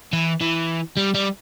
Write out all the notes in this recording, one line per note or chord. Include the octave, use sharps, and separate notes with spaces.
E3
E3
G3
G3